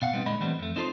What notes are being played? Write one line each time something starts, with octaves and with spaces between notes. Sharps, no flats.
B2 F5 F#5
G3 B3 C4 D#4
A#2 D3 G#3 D#5 B5
E3 G3 A3 B3 C4
F2 A3
C4 D#4 F4 A4 B4 C5